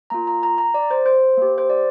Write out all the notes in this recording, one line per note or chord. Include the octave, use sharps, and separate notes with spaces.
A#3 F4 A#5
A#5
A#5
A#5
D5
C5
C5
A#3 G4
C5
D5